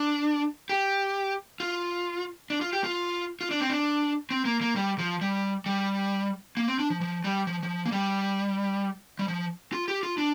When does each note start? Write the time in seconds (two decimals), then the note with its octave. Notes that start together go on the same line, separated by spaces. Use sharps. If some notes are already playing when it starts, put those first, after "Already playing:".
Already playing: D4
0.69 G4
1.60 F4
2.50 D4
2.61 F4
2.73 G4
2.84 F4
3.41 F4
3.51 D4
3.60 C4
3.70 D4
4.31 C4
4.45 A#3
4.61 A#3
4.76 G3
4.99 F3
5.21 G3
5.66 G3
6.57 A#3
6.68 C4
6.79 D4
6.90 F3
7.01 F3
7.24 G3
7.47 F3
7.63 F3
7.86 A#3
7.92 G3
9.19 G3
9.28 F3
9.73 F4
9.88 G4
10.03 F4
10.18 D4